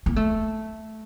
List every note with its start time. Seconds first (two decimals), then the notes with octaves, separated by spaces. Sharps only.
0.06 A#3
0.16 A3